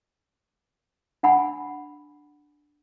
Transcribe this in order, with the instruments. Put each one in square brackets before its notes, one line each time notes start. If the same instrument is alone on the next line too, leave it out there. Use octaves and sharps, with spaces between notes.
[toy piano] D4 F#5 G#5 B5